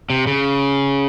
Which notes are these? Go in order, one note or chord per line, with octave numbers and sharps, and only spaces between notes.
C3
C#3